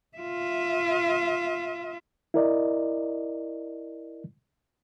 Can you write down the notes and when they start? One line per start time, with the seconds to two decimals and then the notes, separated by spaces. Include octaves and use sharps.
0.17 F4 E5
2.34 E4 A#4 D5 D#5